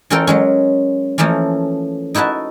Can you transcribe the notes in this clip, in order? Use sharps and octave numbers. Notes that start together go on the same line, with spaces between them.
E3 C#4 F4 A4 A#4 G5
F#3 G#3 C#4
E3 F3 A3 A#3 C#4
D#4 E4 F#4 B4 A5